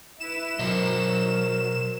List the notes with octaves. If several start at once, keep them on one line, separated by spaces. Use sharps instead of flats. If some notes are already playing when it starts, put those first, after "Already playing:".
E4 B4 E7
B2 F#3 A#4 C5 D#5